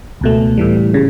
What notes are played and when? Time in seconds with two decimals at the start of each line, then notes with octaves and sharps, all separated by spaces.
0.21 C#2 B2 A3
0.57 A2 E3 G3
0.94 C#3